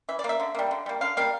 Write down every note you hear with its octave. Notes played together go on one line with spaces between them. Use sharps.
E3 E5
D5
A#3
E5
D3
G3 A#3
D3
G3 A#3
D3 F5
G3 A#3 F5